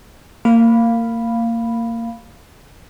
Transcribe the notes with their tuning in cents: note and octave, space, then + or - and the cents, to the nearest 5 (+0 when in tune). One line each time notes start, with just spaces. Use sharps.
A#3 -25 F5 +0 B5 +0